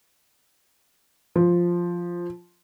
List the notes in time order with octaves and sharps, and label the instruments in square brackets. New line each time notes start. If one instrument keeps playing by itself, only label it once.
[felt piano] F3